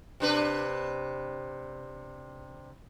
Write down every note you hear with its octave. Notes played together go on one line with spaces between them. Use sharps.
C3 D4 B4